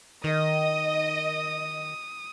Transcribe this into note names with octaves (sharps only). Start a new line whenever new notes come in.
D#3 D#5 D#6